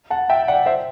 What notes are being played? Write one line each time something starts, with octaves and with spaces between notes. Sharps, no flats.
F#5 A5
E5 G5
D5 F#5
C5 E5